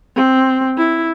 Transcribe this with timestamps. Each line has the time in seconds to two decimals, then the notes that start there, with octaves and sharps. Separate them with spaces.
0.16 C4
0.78 E4